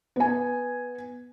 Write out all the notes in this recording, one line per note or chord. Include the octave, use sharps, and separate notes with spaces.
B3 G#5